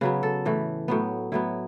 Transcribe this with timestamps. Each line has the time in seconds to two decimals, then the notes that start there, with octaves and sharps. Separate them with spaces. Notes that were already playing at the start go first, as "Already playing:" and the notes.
0.01 C#3 F#3 B3 B4
0.23 A4
0.45 A2 E3 A3
0.88 A2 F#3 B3
1.32 A2 F#3 B3 E4